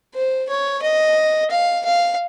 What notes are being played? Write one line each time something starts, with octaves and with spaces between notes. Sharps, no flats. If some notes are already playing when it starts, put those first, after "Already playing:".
C5
C#5
D#5
F5
F5